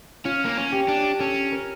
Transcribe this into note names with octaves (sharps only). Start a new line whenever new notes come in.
C#4 F4
A#3
C#4
G4
D4
C#4 A4
A#4